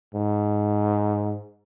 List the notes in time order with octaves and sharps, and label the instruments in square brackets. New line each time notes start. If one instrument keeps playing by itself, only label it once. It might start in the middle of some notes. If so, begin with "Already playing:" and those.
[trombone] G#2